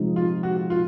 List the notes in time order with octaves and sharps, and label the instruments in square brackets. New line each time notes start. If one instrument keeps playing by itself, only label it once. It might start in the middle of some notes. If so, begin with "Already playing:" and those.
Already playing: [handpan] C3 F3 G#3 D#4
[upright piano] F4
F#4
F4